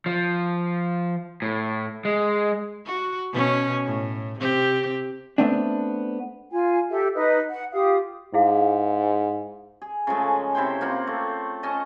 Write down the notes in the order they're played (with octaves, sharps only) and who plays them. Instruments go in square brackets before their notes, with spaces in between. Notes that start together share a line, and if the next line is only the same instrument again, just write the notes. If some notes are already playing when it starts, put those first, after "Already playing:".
[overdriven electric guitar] F3
A2
G#3
[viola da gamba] F#4
B2 C#4
A2
C3 C4 G4
[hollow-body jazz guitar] A3 B3 C4 D4
[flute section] F4 G#5
G4 A4 E5
D#4 B4 D#5 D#6
F#5
F4 G4 F5 D#6
[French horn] G#2 [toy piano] E4 G#4 F5
[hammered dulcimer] G#4
C#3 F3 G#3 A3
C3 E4 C5 G5
A#3 C4 F4 F#5
A3
C#4 A4 D#5 A5